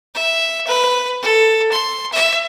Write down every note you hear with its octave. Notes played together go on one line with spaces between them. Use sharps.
E5
B4
A4
C6
E5